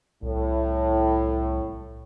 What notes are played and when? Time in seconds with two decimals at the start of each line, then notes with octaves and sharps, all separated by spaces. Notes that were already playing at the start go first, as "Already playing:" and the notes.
0.23 C2 A2